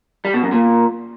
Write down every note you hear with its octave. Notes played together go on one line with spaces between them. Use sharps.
G3
B2
F#2
A#2